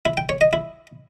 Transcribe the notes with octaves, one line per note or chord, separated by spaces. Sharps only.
E4
G5
C#5
D#5
E4